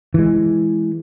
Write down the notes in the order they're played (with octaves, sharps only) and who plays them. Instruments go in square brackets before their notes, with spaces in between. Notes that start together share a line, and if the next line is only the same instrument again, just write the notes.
[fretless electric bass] E3 G#3